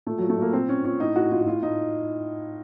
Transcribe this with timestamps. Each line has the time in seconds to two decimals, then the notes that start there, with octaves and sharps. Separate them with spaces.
0.06 A#2 A3
0.18 A#2 F#3
0.30 A3
0.38 A#2 A#3
0.53 A#2 C4
0.69 A#2 C#4
0.85 A#2 C#4
1.00 A2 D#4
1.16 A2 F#4
1.31 A2 F4
1.41 F#4
1.47 A2 F4
1.62 A2 D#4